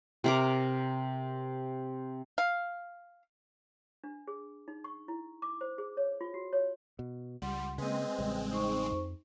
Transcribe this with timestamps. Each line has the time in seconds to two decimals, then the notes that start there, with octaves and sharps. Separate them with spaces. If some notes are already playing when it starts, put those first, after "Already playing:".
0.24 C3 A#4 D6
2.38 F5
4.04 D4
4.28 G#4
4.68 D#4
4.84 C#6
5.08 E4
5.42 D6
5.61 C5
5.78 G#4
5.97 C#5
6.21 F4
6.34 F#4
6.53 C#5
6.99 B2
7.42 C#2 G3 F#5 C6
7.78 C#3 G#3 A#3 C4 B4 D#5
8.18 A1 C#3 G3
8.52 D#4 C5 C#6
8.92 F2